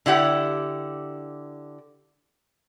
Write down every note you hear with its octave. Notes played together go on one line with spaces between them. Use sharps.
D3 E4 G4 F#5